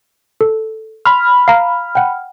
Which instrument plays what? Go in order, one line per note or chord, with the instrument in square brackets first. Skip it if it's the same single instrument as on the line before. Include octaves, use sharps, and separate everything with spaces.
[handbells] A4
[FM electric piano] B5 F6 [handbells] C6
[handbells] F5 A#5
F#5 G5